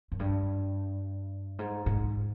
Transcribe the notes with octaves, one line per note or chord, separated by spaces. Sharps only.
F#2
G2
G#2
G#2